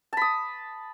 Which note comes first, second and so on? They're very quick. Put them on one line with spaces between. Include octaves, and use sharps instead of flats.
A5 B5 D#6